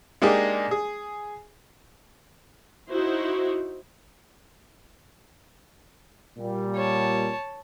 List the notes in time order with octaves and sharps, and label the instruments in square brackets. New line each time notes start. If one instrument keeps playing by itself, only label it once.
[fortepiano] G#3 A#3 D4 D#4 G4 G#4
G#4
[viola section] D#4 E4 F#4 C5
[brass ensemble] A#2 G3
[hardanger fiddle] C#5 A5